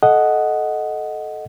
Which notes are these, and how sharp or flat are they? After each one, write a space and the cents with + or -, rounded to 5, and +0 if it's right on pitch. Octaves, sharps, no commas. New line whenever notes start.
A4 -15 D#5 +0 F#5 +0